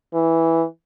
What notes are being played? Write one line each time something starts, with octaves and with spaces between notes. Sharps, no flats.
E3